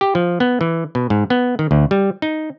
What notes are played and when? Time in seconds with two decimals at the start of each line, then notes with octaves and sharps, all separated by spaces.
0.01 G4
0.15 F3
0.40 B3
0.61 E3
0.95 B2
1.10 G#2
1.30 B3
1.59 D#3
1.71 D2
1.91 G3
2.22 D#4